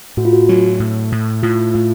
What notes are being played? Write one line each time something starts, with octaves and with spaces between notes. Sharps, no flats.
A2 F#4
F4
F#4
F#3
A2
A2
A2 F4
A2 F4